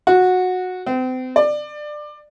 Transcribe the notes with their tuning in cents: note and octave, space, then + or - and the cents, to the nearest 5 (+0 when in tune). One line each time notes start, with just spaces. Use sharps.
F#4 -15
C4 -35
D5 +20